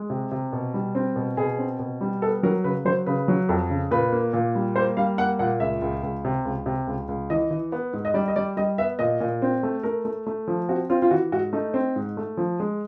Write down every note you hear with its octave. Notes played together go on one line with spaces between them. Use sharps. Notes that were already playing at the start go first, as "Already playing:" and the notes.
Already playing: G#3
C3
C3
B2
G3
C4
B2
B2 G#4
C4
B2
G3
B3 A4
F#3 A#4
C#3 B4
F#3 C5
C#3 B4
F#3
F2
C#3
A#2 B4
A#3
A#2
G3
A#3 C5
G3 F5
A#3 F#5
A#2 F#5
C#2 E5
C#2
C#2
C3
C#2
C3
C#2
C#2
E3 D#5
E3
B3
G#2
D#5
G3 D5
D#5
G3 D5
G3 D#5
B3 E5
A#2 D#5
A#2
C4
A3
A3 A#4
A3
A3
F3
C4 F#4
C4 F4
F4
E3 F#4
G#2 F#4
A3 D#4
C4
G#2
A3
F3
G#3